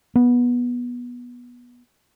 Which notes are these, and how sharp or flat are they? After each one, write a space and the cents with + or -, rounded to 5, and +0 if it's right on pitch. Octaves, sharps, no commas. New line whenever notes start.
B3 -15